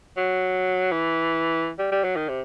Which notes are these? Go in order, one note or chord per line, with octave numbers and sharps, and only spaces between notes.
F#3
E3
G3
G3
F#3
D#3
C3